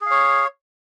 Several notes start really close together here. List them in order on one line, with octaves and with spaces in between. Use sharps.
G#4 F5 C#5